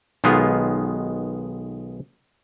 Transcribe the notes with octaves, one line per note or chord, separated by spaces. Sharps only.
B1 D#3 G#3 B3 F4